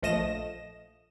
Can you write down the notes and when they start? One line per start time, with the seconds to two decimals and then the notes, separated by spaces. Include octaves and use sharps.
0.02 A#1 F3 A3 D#5 A#6 E7